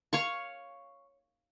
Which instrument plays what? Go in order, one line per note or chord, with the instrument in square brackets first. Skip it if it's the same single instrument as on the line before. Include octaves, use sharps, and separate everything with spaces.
[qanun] C#5 F5 C#6